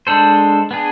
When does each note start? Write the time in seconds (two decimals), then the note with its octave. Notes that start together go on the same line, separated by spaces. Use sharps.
0.07 G#3 D4 A4 C5
0.71 B3 D4 G#4